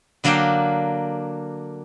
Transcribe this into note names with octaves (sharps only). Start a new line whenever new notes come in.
D3 F#3 A#3 D4 F5 G5